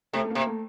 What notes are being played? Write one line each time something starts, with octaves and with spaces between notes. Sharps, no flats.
C3 A3
A3
A#3
C3
A3